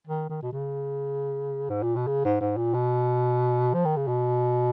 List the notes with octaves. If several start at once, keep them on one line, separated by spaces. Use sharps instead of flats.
D#3
D#3
B2
C#3
G#2
A#2
B2
C#3
G#2
G#2
A#2
B2
F3
D#3
C#3
B2